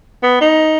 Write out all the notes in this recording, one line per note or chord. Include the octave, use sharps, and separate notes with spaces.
B3
D#4